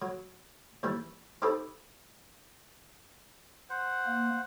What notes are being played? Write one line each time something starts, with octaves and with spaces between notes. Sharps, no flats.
F#3
D#2 E3 G3
C4 D#4 G4 A4 B4
C5 F#5
A#3